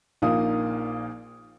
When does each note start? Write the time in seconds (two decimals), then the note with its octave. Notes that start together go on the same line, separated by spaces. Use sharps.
0.22 A#1 A#2 A#3 D#4 F5 D#6